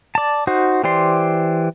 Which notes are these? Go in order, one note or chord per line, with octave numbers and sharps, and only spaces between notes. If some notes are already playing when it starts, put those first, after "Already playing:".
D5 A5
D#4 F#4 C5
E3 G4 C5 D5 C6